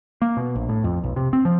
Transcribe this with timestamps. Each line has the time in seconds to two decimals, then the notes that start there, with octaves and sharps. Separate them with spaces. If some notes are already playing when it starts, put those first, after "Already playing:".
0.22 A#3
0.37 B2
0.55 A#1
0.69 A2
0.84 F2
1.04 B1
1.16 C3
1.33 C4
1.45 F3